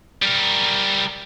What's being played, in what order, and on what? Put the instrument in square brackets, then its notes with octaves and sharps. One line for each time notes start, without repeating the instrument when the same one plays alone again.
[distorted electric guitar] G3 A#4